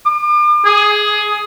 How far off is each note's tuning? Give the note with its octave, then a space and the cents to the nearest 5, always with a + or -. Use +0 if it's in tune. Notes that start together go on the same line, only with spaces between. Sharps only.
D6 +40
G#4 +15